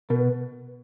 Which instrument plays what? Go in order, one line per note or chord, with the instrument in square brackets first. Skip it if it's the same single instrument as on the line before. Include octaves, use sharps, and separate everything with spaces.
[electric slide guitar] B2 [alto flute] A#4
[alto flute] B4